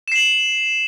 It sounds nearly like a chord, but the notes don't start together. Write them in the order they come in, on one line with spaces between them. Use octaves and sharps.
E7 C7 F#7